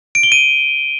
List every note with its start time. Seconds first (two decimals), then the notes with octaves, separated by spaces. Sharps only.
0.15 D7
0.23 G7
0.32 D#7